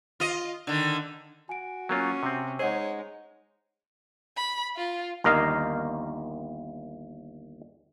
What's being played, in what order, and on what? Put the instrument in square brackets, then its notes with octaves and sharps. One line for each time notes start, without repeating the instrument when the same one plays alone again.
[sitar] F4 D#5
D3 D#3
[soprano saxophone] F#4 [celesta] G#5 D7
[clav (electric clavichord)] F#3 A#3 F4 [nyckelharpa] C#4
[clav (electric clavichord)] C3 C4
[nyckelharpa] G#3 D#4 [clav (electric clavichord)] G#4 [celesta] C5 D#5 F#5 [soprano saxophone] C#5
[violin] B5
F4
[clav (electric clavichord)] G1 D#2 A#4 D#5 F5